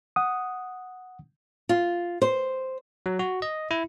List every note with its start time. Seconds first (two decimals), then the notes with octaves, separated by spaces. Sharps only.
0.16 F#5 D#6
1.69 F4
2.22 C5
3.06 F#3
3.19 F#4
3.42 D#5
3.71 E4